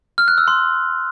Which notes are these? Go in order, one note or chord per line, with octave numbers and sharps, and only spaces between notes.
F6
F#6
E6
C6